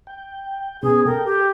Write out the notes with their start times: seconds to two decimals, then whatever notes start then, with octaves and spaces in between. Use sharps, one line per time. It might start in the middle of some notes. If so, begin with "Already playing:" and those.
0.07 G5
0.83 B2 B3 C#4 G#4
1.06 A4 A#4 G5
1.25 G4